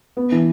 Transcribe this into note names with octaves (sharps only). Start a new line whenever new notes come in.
B3
E3